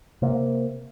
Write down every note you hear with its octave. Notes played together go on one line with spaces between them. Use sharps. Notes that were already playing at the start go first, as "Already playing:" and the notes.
C3 A#3